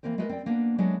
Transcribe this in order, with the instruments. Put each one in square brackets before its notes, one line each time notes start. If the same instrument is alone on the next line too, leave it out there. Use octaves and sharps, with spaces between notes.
[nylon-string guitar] E3 F#3 A#3 C4 A#4 C5
G#3 A3 A#4 B4 D#5
C4 D5 G5
A#3 B3 D4
F#3 G#3 A3 B3 D4